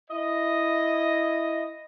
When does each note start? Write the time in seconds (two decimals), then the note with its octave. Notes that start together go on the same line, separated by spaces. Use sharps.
0.11 E4 D#5